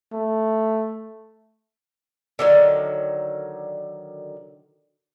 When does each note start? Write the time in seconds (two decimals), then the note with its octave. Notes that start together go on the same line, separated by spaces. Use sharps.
0.12 A3
2.39 D3 D#3 F#3